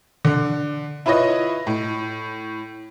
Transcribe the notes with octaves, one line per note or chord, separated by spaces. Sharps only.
D3
E4 F4 B4 C#5 D#5
A2